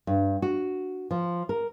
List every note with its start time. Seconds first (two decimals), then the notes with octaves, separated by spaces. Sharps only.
0.07 G2
0.42 F#4
1.11 F3
1.49 A#4